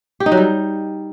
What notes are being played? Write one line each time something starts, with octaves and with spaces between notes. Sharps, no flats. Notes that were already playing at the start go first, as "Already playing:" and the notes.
G4
D#4
F#3
G3